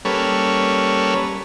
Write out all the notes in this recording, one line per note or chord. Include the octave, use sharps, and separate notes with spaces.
G3 A#3 C#4 A4 B4 C#5